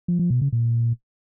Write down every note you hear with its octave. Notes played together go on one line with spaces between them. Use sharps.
F3
F3
B2
C#3
A#2